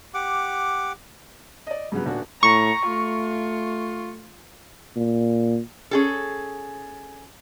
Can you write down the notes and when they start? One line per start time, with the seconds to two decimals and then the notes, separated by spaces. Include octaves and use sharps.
0.14 G4 F#5 D6
1.67 D5 D#5
1.92 G2 C#3 F#3 B3
2.06 D#1 D4 F#4
2.43 A2 A#5 C#6
2.87 A3 F4
4.97 A#2
5.91 C#4 G#4 A4